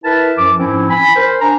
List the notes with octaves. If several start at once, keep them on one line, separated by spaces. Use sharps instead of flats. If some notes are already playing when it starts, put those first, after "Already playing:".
E4 A#4 B4 A5
F#2 F3 D6
G#2 F3 C4 C#4 E4
G#5 B5
A#4 C5
D4 G#5 A#5